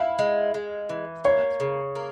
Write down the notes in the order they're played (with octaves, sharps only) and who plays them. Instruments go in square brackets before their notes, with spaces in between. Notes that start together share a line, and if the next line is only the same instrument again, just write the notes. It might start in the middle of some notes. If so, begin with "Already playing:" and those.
Already playing: [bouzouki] E4 [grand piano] F5
[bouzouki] G#3
G#3
E3
[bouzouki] A#3 [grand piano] C#5
[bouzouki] C#3
A#3